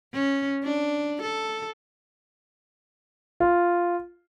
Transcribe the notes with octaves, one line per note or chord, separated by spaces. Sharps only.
C#4
D4
A4
F4